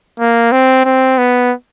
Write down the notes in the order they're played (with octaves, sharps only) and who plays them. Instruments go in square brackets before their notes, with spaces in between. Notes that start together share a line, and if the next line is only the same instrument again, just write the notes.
[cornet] A#3
C4
C4
B3